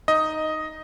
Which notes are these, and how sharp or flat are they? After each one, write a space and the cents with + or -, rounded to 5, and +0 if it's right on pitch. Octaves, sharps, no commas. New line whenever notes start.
D#4 +0 D#5 +5